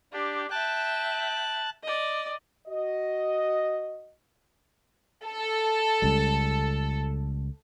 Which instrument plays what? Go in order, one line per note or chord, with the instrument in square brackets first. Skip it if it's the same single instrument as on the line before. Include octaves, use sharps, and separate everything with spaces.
[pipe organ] D4 [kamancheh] G4
[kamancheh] E5 G5 [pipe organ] A5 F#6
[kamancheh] D5 D#5
[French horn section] F#4 D#5
[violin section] A4
[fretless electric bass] C#2 G3